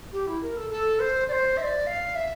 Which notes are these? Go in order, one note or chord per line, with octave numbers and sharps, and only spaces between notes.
G4
E4
A#4
A4
A4
C5
D5
C5
E5
D5
F5
E5